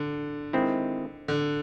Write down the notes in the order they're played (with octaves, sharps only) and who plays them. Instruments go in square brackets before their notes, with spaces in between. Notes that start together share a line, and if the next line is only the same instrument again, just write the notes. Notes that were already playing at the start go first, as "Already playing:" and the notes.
Already playing: [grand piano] D3
[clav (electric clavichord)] D#3 G#3 C4 E4
[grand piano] D3